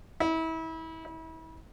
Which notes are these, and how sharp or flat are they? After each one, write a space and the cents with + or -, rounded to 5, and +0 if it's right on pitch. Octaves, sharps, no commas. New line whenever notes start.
E4 -30
E4 -35